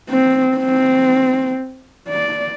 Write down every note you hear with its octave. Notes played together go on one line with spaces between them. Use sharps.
C4
C4
D5